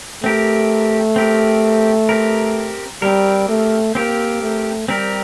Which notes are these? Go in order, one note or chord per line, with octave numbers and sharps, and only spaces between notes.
A3 C4 G4 A#4
C4 G4 A#4
C4 G4 A#4
G3 C4 G4 A#4
A3
A#3 C4 G4 A#4
A3
G3 C4 G4 A#4